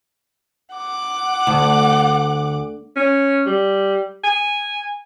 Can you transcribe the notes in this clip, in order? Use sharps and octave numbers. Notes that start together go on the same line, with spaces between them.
F#5 D6
D2
C#4
G3
G#5